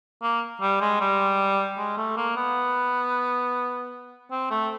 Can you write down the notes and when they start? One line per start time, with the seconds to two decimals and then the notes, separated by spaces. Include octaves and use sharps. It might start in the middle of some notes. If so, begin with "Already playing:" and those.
0.23 A#3
0.61 G3
0.81 G#3
1.01 G3
1.78 G#3
1.98 A3
2.17 A#3
2.37 B3
4.31 C4
4.51 A3